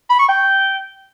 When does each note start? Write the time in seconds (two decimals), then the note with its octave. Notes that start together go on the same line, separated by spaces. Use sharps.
0.10 B5
0.19 C#6
0.29 G5